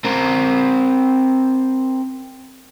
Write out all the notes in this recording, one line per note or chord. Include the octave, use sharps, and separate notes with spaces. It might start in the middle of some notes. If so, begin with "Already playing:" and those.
C4 A#4